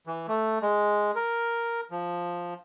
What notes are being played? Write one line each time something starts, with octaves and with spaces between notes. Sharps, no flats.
E3
A3
G#3
A#4
F3